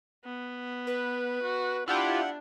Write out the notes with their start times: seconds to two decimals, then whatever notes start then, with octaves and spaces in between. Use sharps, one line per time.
0.25 B3
0.87 B4
1.43 F#4
1.88 D4 E4 F4 G4 F#5